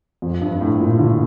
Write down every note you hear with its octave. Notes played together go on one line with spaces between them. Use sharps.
F2
G2
A2
A#2
D3